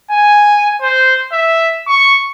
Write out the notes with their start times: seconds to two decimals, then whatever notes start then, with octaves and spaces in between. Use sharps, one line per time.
0.11 G#5
0.82 C5
1.32 E5
1.88 C#6